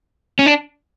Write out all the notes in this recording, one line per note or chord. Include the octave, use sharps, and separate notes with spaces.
C#4
D4